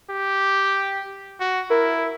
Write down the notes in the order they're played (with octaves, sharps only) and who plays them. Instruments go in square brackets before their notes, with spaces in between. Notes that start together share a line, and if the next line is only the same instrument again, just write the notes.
[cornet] G4
F#4
[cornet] E4 [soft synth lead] A#4